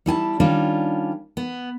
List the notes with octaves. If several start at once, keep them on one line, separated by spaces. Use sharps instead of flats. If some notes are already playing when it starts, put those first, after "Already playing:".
G3 E4 G#5 A5
D#3 G3 C#4 D4 F4
B3